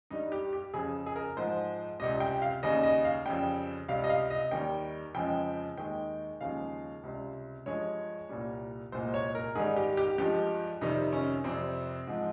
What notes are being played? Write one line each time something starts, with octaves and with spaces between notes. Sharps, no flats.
G2 G3 D#4
G4
G4
F2 C#3 F3 G#4
G#4
A#4
G#2 F3 G#3 C5
C#2 C3 G3 D#5
G5
F5
D#2 C#3 G3 D#5
D#5
F5
F2 C#3 G3 G5
C#2 C3 G3 F5
D#5
F5
D#5
D#2 D#3 G3 G5
F2 C#3 F3 G#3 G5
D#2 D#3 G#3 G5
D#2 C#3 F3 G#3 F5
C#2 C3 G3
G2 F3 G#3 C#5
C2 A#2 G3
C2 A#2 G#3 C5
C#5
A#4
G#2 D#3 G3 G#4
G4
G4
G2 F3 G#3 G4
F2 C3 D#3 G3 D#4
C#4
F2 C3 G3 C4
G#2 F3 G#3